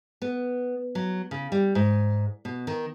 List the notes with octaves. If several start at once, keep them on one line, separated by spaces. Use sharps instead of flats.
B3
F#3
C#3
G3
G#2
B2
D#3